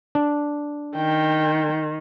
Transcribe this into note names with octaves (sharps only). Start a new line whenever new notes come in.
D4
D#3 G5